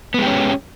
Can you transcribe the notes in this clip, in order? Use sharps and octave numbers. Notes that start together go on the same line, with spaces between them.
G#3 B3 C#4 G4